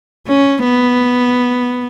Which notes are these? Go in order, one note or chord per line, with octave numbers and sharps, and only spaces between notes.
C#4
B3